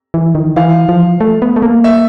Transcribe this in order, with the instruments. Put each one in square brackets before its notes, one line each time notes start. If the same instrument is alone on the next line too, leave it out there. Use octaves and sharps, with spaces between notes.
[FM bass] E3
D#3
[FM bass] E3 [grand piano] F5
[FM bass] F3
A3
B3
A3
A#3
[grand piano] E5